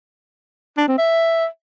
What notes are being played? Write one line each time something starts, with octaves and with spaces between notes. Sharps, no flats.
D4
C4
E5